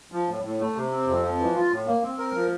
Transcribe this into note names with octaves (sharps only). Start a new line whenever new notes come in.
F3
A2
A2
A3
C3
C4
F2
F3
E3
F4
A2
A#3
C4
A#4
F3